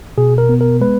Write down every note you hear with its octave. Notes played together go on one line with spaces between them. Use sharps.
B2 G#4
A#4
B3
A#4
G#3 B4